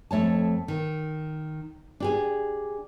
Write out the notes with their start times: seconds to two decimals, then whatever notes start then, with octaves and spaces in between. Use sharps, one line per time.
0.11 F2 A3 C#5 A5
0.68 D#3
2.00 D4 G4 G#4